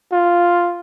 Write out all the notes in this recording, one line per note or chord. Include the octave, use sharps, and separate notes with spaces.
F4